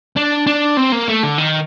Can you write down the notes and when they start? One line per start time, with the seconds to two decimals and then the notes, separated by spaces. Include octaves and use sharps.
0.16 D4
0.47 D4
0.77 C4
0.92 A#3
1.08 A3
1.23 D3
1.38 D#3